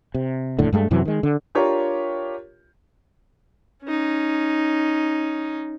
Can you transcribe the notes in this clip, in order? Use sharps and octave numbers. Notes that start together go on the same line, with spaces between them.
C3
F1 D#2 A2 D3
G2 G#3 A3
F#2 C3 E3 F#3
D#3 G#3
D3
D4 F4 G4 A#4 C#5
C#4 D#4